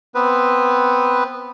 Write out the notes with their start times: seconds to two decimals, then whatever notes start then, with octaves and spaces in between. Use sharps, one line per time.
0.15 B3 C4 B4